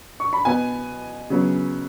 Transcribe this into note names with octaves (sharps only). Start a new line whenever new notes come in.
C#6
B5
B2 B3 G#5
C#3 F#3 B3